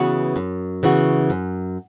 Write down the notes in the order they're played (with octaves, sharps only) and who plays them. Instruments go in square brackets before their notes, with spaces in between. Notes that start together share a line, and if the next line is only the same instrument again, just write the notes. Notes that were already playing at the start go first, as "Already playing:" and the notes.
Already playing: [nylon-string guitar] C#3 E3 B3 F#4
F#2
C#3 E3 B3 F#4
F#2